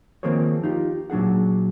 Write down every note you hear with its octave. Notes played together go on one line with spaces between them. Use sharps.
D#3 F3 A#3 C4 G#4 C#5
D#4 F4 G4
A#2 F#3 D4 G#4 F#5